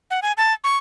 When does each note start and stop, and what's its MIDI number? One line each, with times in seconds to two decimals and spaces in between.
0.11 0.20 78
0.22 0.32 80
0.37 0.53 81
0.64 0.77 85